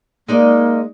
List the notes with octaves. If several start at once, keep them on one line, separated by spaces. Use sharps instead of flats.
G#3 A#3 D#4 D5